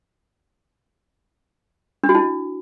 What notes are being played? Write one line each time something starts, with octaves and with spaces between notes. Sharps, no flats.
D4
F#4
E4